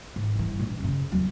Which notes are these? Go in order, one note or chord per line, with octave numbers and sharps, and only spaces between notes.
G#2
G2 E3
A#2 D4
F#2 C#3
E2 F#3